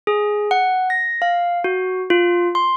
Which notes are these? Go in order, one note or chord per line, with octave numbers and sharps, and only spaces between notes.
G#4
F#5
A#6
F5
F#4
F4
C6